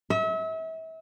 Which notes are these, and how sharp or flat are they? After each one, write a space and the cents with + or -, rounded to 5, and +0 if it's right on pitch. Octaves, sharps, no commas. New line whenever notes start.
E5 -35